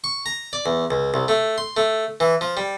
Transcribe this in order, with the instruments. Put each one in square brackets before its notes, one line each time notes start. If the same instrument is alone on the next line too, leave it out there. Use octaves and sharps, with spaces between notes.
[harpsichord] C#6
A#5
D5
E2
C#2
C2
A3
C6
A3
E3
F3
G3